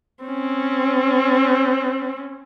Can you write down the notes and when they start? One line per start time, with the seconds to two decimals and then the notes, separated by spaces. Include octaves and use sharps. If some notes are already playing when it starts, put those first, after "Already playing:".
0.24 C4 C#4